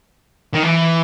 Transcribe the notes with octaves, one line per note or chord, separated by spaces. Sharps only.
D#3
E3